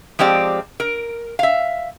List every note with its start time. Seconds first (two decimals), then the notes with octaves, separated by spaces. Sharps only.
0.19 F3 G#3 C4 G4 D5
0.80 A#4
1.39 E5 F5